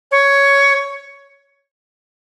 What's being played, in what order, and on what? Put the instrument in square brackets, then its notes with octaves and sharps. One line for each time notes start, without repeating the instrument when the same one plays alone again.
[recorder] C#5